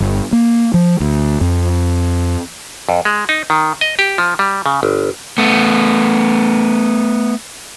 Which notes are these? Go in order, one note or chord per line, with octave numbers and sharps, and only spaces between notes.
G1
A#3
F3
D2
F2
F2
G#3
D#4
D#3
D#5
G4
F3
G3
C#3
G1
A3 B3